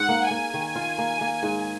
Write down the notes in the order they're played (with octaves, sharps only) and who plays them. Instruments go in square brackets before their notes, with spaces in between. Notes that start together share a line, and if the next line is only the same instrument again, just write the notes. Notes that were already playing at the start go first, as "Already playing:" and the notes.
Already playing: [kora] G#2 [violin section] F#5
[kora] A#3
[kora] A#3 [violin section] G#5
[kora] D#3
F4
A#3
A#3
G#2